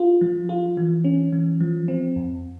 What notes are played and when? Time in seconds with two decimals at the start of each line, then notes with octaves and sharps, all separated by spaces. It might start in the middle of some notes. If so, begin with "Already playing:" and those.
Already playing: F4
0.21 F3
0.49 F4
0.77 E3
1.04 C#4
1.33 E3
1.61 F3
1.88 C4
2.16 F2